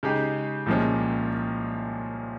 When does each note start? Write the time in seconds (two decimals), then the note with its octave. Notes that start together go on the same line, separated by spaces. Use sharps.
0.03 C#3 G#3 D#4 G4
0.66 C2 A#2 F3 G#3 C#4